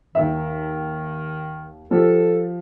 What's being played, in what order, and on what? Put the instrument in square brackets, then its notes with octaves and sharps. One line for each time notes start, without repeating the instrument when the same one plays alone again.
[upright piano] D#2 E5 [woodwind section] D#3
[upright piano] F3 G4 [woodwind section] A4